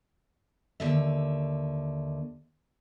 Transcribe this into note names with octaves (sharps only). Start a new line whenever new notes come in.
D#2 D3 E5